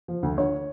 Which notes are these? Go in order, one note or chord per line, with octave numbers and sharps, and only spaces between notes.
F3
D2
D3 C#5